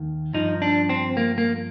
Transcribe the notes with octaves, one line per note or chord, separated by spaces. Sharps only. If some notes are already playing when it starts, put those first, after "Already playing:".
Already playing: D#2 D#3
G2 F3 D#4
D4
C4
A#3
A#3